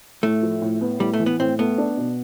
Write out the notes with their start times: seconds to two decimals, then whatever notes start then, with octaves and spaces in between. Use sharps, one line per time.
0.23 A2 A3
0.43 F3
0.61 A2
0.81 B3
1.00 A2 G3
1.13 A3
1.20 E3
1.26 B3
1.39 A2 C4
1.59 A3 B3
1.78 D4
1.97 B2